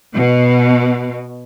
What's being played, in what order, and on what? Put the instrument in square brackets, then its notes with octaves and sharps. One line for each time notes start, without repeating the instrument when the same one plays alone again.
[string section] B2